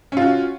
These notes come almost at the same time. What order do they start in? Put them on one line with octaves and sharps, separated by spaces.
C#4 F4 F#4